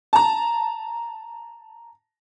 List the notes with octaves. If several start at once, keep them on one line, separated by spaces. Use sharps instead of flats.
A5 A#5